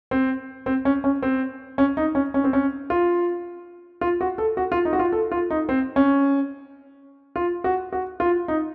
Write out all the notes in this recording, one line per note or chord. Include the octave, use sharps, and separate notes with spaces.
C4
C4
C#4
C#4
C4
C#4
D#4
C#4
C#4
C4
C#4
F4
F4
F#4
A4
F#4
F4
D#4
F#4
F4
A4
F4
D#4
C4
C#4
F4
F#4
F#4
F4
D#4